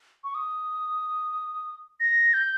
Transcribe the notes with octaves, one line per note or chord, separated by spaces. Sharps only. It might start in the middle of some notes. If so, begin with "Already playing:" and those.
C#6
D#6
A#6
G6